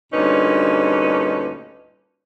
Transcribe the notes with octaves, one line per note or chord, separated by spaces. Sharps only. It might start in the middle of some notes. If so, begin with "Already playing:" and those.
D2 G2 A#2 C#4 D#4 B4